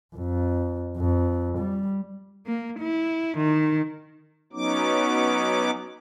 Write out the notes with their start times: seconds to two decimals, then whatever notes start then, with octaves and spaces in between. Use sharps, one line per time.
0.15 F2
0.97 F2
1.58 G3
2.46 A#3
2.80 E4
3.37 D#3
4.53 F#3 B3 C#4 D#4 D6